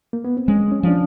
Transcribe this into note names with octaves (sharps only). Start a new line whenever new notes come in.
A#3
B3
C4
G#3 C#4
C#4
F3 D4